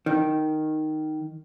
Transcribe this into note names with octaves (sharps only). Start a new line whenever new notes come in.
D#3